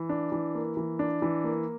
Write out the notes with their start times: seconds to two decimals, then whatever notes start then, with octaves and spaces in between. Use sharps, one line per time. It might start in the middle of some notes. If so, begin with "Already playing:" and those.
Already playing: E3
0.09 D4
0.32 E3
0.55 A#3
0.77 E3
0.99 D4
1.22 E3
1.44 A#3